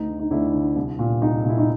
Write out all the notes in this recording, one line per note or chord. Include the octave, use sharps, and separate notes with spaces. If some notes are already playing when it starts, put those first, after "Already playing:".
Already playing: D2 D#4
D3
D#4
D2 D4 E4
D3
C2
A#2
C2 D#4
A#2 E4
D#4